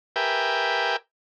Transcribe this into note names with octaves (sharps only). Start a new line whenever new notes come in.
G4 A#4 B4 E5 G5 G#5